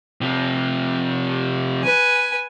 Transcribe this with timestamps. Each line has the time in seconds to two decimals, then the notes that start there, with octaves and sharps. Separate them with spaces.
0.21 C3 F3
1.83 B4 G#5